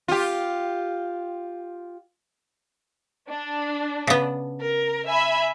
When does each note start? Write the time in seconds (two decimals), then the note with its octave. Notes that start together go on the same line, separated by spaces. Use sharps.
0.08 F4 G4
3.30 D4
4.07 C#3 B3
4.60 A#4
5.07 E5 G#5 B5